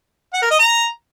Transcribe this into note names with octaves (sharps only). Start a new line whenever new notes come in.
F#5
A#4
D#5
A#5